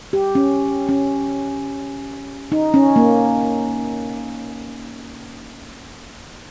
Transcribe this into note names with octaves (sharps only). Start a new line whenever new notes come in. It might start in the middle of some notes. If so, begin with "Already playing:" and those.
G4
C#4
C#4
D#4
C#4
A#3